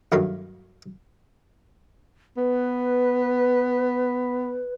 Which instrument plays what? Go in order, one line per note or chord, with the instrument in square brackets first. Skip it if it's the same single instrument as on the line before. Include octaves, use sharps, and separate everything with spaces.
[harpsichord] A1 G2 D#3 F#3 A3 F5
[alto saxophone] B3 [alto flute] B4